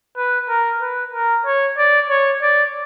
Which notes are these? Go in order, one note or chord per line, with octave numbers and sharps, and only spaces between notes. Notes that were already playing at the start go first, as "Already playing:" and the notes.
B4
A#4
B4
A#4
C#5
D5
C#5
D5